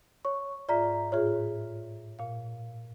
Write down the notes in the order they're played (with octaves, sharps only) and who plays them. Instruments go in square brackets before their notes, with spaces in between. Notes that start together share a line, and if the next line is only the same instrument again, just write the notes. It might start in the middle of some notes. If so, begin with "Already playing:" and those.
[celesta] C#5 C#6
[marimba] G#2 F4 E5 [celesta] D5 A#5 B6
[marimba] A2 F4 G#4 [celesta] C#5 E5
[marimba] A#2 F5